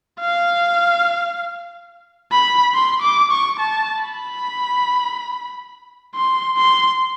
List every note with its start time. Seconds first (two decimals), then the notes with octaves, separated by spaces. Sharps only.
0.20 F5
2.32 B5
2.74 C6
3.03 D6
3.31 C#6
3.60 A5
4.03 B5
6.15 C6
6.57 C6